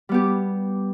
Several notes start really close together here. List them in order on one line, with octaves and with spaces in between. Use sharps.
G3 B3 G4